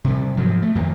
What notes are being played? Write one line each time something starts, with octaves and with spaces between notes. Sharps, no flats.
C3 G3
G#2 F3 F#3
A3
F2 D#3 A#3